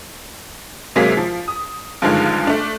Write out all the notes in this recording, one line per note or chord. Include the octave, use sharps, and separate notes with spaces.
C3 F#3 G#3 A#3 G#4 B6
F3
D#6
G2 D3 D#3 F3 G#3
A3 D4